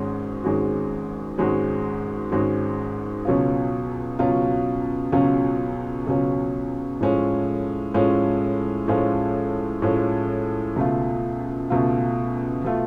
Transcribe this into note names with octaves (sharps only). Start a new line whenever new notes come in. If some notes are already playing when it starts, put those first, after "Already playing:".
Already playing: G#1 G#2 G#3 C#4 F#4
G#1 G#2 G#3 C#4 F#4
G#1 G#2 G#3 C#4 F#4
G#1 G#2 G#3 C#4 F#4
C#2 B2 F#3 C#4 F4
C#2 B2 F#3 C#4 F4
C#2 B2 F#3 C#4 F4
C#2 B2 F#3 C#4 F4
A2 F3 G#3 C#4 F4
A2 F3 G#3 C#4 F4
A2 F3 G#3 C#4 F4
A2 F3 G#3 C#4 F4
C#2 B2 A3 F4
C#2 B2 A3 F4
B2 A3 F4